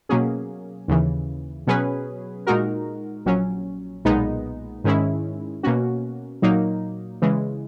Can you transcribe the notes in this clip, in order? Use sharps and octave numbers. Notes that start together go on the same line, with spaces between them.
B2 F#3 A#3 C#4 G#4
D#2 C#3 E3
B2 F#3 C#4 G#4 B4
A#2 G#3 D#4 F#4 A#4
A#1 A#2 F#3 C#4
B1 A#2 G#3 B3 D#4
G#2 D#3 G#3 C#4 E4
B2 A#3 C#4 F#4
A#2 F#3 A#3 D#4
C#3 E3 G#3